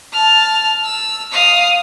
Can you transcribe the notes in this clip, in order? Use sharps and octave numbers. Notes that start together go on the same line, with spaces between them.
A5 F6
E6
F5 D#6